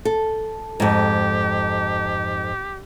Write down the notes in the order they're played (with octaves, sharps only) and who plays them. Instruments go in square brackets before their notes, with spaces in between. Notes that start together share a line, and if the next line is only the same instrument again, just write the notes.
[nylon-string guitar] A4
[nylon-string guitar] F2 G#2 [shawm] G4